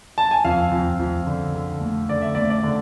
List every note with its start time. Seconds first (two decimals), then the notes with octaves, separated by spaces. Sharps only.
0.18 A5
0.31 G#5
0.45 F2 F5
0.71 F2
0.99 F2
1.26 D3
1.55 D3
1.81 A3
2.09 D3 D5
2.22 E5
2.35 A3 D5
2.50 D5
2.63 D3